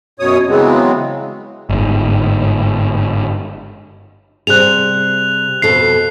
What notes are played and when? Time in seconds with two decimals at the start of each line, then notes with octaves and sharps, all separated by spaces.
0.20 F#2 B2 C#5 D#6
0.49 C#3 E3 F#3 G#3 B3 C4
1.69 G1 G#2
4.47 C3 G3 G#4 F#6 F7
5.62 F2 B2 A4 C7